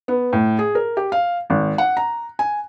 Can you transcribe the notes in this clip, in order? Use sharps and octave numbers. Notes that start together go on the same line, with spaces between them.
B3
A2
G#4
A#4
G4
F5
G#1
F#5
A#5
G#5